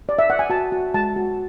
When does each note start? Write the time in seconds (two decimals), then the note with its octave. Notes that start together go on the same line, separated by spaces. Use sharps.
0.09 D5
0.19 E5
0.30 F#5
0.39 G#5
0.50 F#4 A5
0.72 F#4
0.94 G#3 A5
1.16 F#4